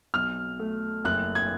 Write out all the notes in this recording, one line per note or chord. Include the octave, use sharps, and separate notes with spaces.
B1 F6
A3
F#1 F#6
G#6